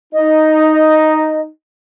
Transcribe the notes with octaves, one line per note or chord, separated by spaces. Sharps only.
D#4 D#5